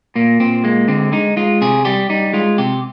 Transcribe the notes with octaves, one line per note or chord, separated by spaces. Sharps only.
A#2 A#3
A#2 C4
G#3 A#3
D3 C4
G#3 D#4
G#3 F4
C3 G#4
G3 G4
G3 D#4
G#3 F4
C3 G4